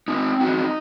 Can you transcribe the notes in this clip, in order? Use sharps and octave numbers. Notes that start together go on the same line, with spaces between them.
C4 D#4
D#4 F#4